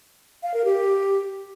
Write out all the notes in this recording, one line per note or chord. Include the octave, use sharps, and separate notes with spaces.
F5
A#4
G4